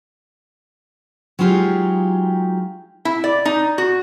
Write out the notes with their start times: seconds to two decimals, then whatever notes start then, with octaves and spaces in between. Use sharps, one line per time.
1.39 F#3 G#3 D#4 F4 G4 G#4
3.05 E4
3.24 D5
3.45 D#4
3.78 F#4